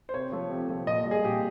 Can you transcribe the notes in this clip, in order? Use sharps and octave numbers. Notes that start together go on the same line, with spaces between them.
C5
C3 C#5
F3 A3
C3
F3 A3
A#2 D#5
G3
G#4
A#2 G4